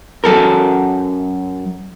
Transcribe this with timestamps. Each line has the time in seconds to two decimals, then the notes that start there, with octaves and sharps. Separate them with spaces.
0.24 F#2 A4 A#4